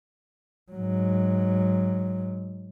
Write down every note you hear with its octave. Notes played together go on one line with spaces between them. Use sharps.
G#2 F#3